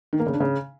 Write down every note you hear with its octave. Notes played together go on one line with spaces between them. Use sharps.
D#3
A#3
C#3
D4
C#3